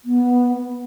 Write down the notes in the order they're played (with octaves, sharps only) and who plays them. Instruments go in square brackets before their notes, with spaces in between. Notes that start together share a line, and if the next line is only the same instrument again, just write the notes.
[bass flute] B3